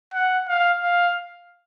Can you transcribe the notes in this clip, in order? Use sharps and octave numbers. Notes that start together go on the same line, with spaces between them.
F#5
F5
F5